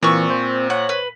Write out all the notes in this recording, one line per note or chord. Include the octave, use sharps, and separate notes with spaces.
A#2 E3 C4 C#6 E6
C5
C#5 F#5
B4